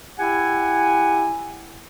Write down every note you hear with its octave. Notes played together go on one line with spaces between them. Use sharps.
E4 G4 F#5 G#5